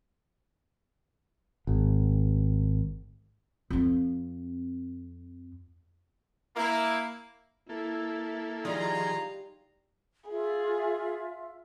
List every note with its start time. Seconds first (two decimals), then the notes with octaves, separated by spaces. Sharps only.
1.67 G#1
3.70 F2 C4
6.56 A#3 E4
7.69 A#3 E4 A4
8.65 D#3 F3 G3 D#4 F4 G#4 F5 A#5
10.29 F4 G#4 E5